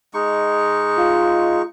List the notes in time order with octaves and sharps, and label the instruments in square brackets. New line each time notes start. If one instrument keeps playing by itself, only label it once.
[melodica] G#3 D#4 C#6
[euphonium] F4